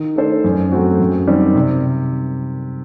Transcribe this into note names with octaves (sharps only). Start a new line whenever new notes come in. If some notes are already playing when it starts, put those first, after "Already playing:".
Already playing: D#3
A3 D4 A4 C5
F#2
F#3 A3 C4 F#4
F#2
D#3 G3 C4 G4
C3